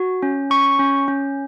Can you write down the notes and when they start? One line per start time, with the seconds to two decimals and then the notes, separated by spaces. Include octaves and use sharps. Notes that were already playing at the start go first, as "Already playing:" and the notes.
Already playing: F#4
0.23 C#4
0.50 C#4 C#6
0.79 C#4
1.08 C#4